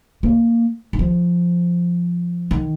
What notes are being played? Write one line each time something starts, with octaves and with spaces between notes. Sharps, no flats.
A#3
D#3
F3
D#3